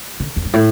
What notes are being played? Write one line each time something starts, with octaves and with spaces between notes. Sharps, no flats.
D3
F2
G2
A2